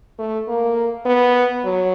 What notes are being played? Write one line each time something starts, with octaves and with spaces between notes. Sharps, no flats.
A3
A#3
B3
F#3